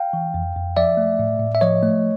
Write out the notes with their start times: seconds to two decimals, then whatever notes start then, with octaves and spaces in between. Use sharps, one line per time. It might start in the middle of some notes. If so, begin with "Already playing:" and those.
Already playing: F5 G5
0.13 E3
0.34 F2
0.55 F2
0.77 F3 D5 E5
0.97 A3
1.19 A2
1.39 A2
1.55 E5
1.61 F3 C#5 D#5
1.83 A3